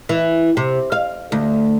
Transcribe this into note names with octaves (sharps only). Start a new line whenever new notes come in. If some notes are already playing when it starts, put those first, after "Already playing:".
E3
C3
F5
D2